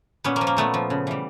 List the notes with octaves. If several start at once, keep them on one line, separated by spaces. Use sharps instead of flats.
A#2 B3 C#4
A#3
F3
A#3
A#2 A3 B3
F3
C#3
E3 G3